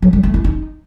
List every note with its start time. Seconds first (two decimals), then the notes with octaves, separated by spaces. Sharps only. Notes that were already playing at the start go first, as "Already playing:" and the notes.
0.02 F#3
0.13 G#3
0.23 A3
0.34 E4
0.44 D#4